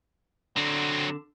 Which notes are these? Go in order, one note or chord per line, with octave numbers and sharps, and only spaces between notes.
D3 F#3 C4